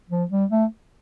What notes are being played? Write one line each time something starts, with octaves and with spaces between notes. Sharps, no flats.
F3
G3
A3